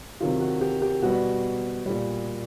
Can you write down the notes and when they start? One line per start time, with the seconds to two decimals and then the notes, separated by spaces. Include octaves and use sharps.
0.20 C3 D#3 F#3 F4
0.41 F#4
0.61 G4
0.82 G4
1.02 B2 G3 F#4
1.86 A#2 G3